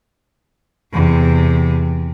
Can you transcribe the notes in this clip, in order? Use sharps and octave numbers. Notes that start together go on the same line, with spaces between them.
E2 C3